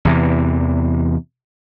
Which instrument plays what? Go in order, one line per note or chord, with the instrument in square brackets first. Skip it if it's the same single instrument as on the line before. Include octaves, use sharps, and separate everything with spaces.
[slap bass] E2 C3 E3